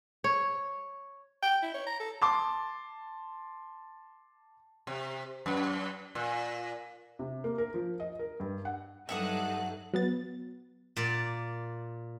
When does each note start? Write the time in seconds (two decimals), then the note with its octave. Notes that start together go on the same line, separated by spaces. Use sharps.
0.24 C#5
1.43 G5
1.62 E4
1.74 C#5
1.87 A#5
2.00 A4
2.21 A5 C6 D6
4.87 C3
5.46 F#2
6.15 A#2
7.19 C3
7.44 A#3
7.58 A#4
7.74 F3
8.00 D#5
8.19 A#4
8.40 G2
8.65 F#5
9.09 G2 F#3 D#4 A4 E5 F#5 D#6 F#6
9.94 F#3 B3 A6
10.97 A#2 D5